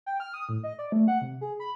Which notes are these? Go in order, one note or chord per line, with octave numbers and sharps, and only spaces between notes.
G5
F6
D#6
A2
D#5
D5
A3
F#5
C3
G#4
B5